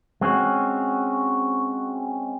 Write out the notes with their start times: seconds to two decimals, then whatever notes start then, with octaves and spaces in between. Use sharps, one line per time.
0.21 G#3 C4 C#4 F#4